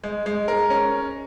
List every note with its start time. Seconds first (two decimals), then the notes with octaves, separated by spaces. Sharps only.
0.04 G#3
0.26 G#3
0.48 A#4
0.70 C#4